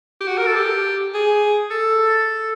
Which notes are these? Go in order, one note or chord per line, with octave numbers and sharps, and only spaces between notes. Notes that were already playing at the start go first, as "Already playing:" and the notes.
G4
F#4
A#4
A4
G4
G#4
A4